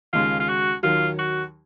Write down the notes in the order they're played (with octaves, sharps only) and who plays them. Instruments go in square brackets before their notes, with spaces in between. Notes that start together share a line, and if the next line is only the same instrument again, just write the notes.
[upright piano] D#2 C#3 G#3 [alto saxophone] F4
[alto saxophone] F4
F#4
[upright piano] D#2 D#3 F#3 [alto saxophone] F4
[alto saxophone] F#4